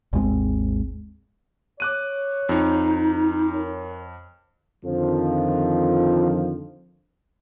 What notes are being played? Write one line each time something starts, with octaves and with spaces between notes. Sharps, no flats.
G#1 D#2 G#3 C4
C#5 D6 F#6 D#7
F2 D#4
A#4 C#5
F2 D3 D#3 F3